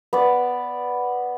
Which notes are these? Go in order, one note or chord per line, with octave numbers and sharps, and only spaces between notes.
B3 D5